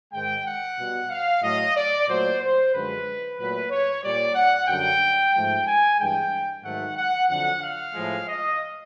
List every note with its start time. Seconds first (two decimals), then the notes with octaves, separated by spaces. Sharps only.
0.12 G#2 D#3 G#3 G5
0.45 F#5
0.77 B2 G3
1.10 F5
1.42 A2 F#3 A3 D#5
1.76 D5
2.08 A#2 F#3 A3 C5
2.41 C5
2.74 F#2 D3 F3 G#3 B4
3.38 A#2 F#3 A3 B4
3.70 C#5
4.03 A#2 G3 D5
4.35 F#5
4.68 F#2 D3 G3 G5
5.33 G#2 F3 A3 G5
5.66 G#5
5.99 G2 E3 G#3 G5
6.63 G#2 D#3 F#3 A3 F#5
6.96 F#5
7.29 F2 D3 F#3 F#5
7.62 F5
7.94 A2 F3 G#3
8.27 D#5